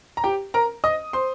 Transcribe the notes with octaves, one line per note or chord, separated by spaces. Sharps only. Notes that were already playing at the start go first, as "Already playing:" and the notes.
A#5
G4 G5
A#4 A#5
D#5 D#6
C5 C6